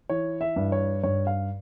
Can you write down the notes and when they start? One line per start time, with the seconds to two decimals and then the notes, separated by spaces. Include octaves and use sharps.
0.09 E3 C#5
0.41 E5
0.56 G2
0.72 C#5
1.03 G2 C#5
1.27 F5